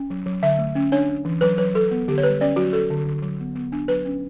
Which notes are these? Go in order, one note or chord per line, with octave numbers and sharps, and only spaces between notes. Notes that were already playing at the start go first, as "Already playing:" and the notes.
Already playing: C#4
F#3
F#3
D3 E5
A3
C#4
D4 C#5
D4
E3
F#3 B4
F#3 B4
F#3 A4
B3
D3 G4
C#5
G3 B4
C#4 D5
F#3 F#4
F#3 A4
D3
D3
F#3
B3
B3
D4
F#3 B4
C#4